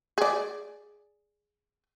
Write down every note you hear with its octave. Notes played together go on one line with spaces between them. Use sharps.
G#4 D5